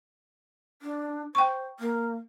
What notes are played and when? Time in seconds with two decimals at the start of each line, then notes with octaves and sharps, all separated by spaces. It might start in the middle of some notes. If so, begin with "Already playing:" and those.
0.82 D4
1.35 C5 G5 C#6
1.80 A#3